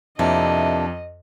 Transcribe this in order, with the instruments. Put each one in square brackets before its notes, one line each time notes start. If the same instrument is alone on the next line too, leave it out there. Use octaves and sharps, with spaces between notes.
[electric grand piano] F2 [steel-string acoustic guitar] C3 A#3 E4 [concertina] D4 [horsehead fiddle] D#5